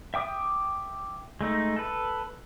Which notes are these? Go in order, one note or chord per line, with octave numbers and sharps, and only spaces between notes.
E5 G5 D6 D#6
G#3 A3 D#4
A4 B4